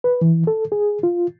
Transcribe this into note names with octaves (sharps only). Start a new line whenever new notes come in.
B4
E3
A4
G#4
F4